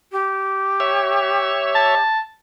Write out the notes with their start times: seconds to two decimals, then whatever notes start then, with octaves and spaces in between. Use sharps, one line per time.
0.12 G4
0.80 C#5 E5
1.75 A5